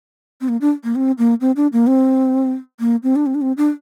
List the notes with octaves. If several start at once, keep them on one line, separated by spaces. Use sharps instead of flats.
C4
A#3
D4
A#3
C4
A#3
C4
D4
A#3
C4
A#3
C4
D4
C4
D4
C4
D4